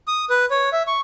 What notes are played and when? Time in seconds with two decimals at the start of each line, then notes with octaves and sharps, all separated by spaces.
0.08 D#6
0.30 B4
0.51 C#5
0.72 E5
0.87 C#6